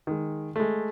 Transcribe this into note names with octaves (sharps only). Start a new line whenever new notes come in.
D#3 G#3
G#3 A3